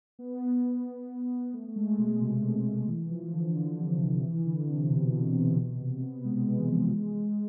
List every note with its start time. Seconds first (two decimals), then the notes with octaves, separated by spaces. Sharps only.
0.19 B3
1.53 A3
1.68 A3
1.76 G#3
1.98 B2
2.21 C3
2.88 E3
3.10 F3
3.33 D3
3.55 D3
3.78 C3
4.00 D3
4.23 E3
4.45 D3
4.68 C3
4.89 B2
5.12 B2
5.34 C3
5.57 B2
5.80 C3
6.01 B3
6.24 G#3
6.47 G#3
6.58 E3
6.69 F3
6.92 G#3
7.14 G#3